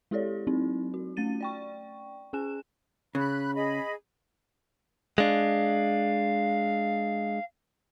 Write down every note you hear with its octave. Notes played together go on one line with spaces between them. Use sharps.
G#3 E4 G4 A4 C#5 D5
F#3 C4 D#4 E4
F#4
A3 C#4 A6 D#7
D5 G5 C#6
C#4 G#4 G#5 F#6 E7
C#3 B5 F#6
G#4 D#5 B5
G#3 D4 F5